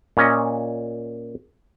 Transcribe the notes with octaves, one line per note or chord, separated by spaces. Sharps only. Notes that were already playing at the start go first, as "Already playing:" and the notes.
A#2 C#4 D#5